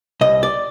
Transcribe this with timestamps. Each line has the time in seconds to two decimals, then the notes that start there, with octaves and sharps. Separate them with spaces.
0.21 C2 D#5
0.43 D5